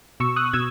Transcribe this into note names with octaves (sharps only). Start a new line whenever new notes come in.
B2 C#6 E6
D#6 F#6
B2 E6 G#6